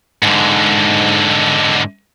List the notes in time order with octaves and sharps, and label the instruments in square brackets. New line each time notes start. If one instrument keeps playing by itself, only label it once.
[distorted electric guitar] G#2 D3